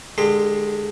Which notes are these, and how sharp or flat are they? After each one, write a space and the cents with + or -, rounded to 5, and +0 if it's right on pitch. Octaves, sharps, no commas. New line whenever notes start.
D3 +25 G#3 +5 G4 +25